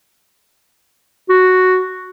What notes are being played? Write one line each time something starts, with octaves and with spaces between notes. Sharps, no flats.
F#4